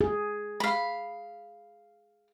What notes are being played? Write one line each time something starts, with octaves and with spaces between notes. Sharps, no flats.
G#4
F5 B5